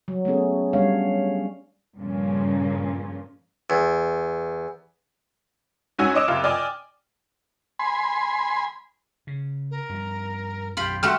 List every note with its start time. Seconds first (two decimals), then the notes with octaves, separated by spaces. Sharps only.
0.08 F#3
0.25 A3 B3 C#4 G#4
0.73 G3 A3 C#4 D4 C#5 F5
1.97 G2 A#2 C#3 F3 C#4
3.70 E2
5.99 G#2 C#4 F#4 G#5 E6 G#6
6.14 C#5 D#5 D6 E7
6.28 F#1 C3 F4 F6
6.44 D5 D#5 G5 G#5 D6
7.79 G#5 B5 C6
9.27 C#3
9.70 A#4
9.89 G2 F3
10.77 B1 F#2 F4 G4 B5
11.03 G3 A3 F#4 C6 F6